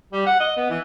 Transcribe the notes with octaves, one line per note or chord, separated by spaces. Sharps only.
G3
F#5
D#5
B3
E3